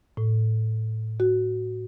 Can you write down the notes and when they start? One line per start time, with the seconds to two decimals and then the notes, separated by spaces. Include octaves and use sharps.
0.17 A2
1.20 F#4